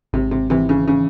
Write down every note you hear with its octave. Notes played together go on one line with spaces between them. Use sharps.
G#1 C3
C3
C3 E3
C#3
C#3